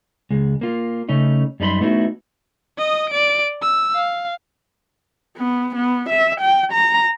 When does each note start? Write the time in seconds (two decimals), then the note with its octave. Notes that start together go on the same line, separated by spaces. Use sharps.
0.30 C#2 G#3
0.61 A#3 F4
1.09 C#3 A3 C#4 D#4
1.60 F#2 G3 D#4 B4 B5 C6
1.81 A3 B3 D#4 E4 F#4
2.78 D#5 D#6
3.09 D5 D7
3.61 E6
3.95 F5
5.37 B3
5.75 B3
6.09 E5
6.40 G5
6.72 A#5